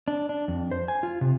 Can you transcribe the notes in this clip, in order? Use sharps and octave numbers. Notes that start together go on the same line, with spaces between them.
D4
D4
F2
C5
G#5
F4
C3